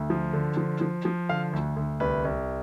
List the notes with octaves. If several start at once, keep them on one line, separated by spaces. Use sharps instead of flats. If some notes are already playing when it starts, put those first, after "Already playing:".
Already playing: D2
F3
D3
F3
F3
F3
D3 F5
D2
D2
C2 B4
C2